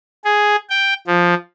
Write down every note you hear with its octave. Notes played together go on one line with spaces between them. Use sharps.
G#4
G5
F3